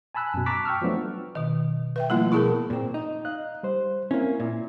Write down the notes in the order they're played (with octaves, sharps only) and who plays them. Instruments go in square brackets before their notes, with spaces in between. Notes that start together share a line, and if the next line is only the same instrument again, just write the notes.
[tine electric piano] G#5 A5 B5 E6 F#6
F#2 B2
A5 A#5 C#6 D6 F#6 B6
G5 C#6 E6 F6
F3 F#3 A3 B3 D4 F4
[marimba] B2 D#3
[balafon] B4 E5 G5
[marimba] F3 A3 E4 [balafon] G3 A#3 F4
[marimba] B2 B3 A5 [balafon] E4 G#4 A#4
[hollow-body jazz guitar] A#2 C4
D#4
[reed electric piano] D#5 F5 F#6
G3 C5
[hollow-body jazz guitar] A#3 C#4 [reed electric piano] C4 E4
[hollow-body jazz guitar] A#2 [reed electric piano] E4